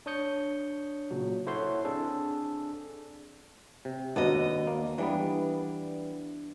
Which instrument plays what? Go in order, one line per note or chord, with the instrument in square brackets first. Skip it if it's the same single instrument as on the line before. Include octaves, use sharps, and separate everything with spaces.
[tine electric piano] D4 C#5 D#6 G6 C#7
A#2 C#3 F#3 F#4
E4 A4 C5 C#5 F#5 C6
C4 D4 G#4 A4
[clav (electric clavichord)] C3
[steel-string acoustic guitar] D#2 F#4 D#5 [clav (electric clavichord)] B3 D4
[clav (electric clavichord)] A#3
[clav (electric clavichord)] E3 G3 B3 [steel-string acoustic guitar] D4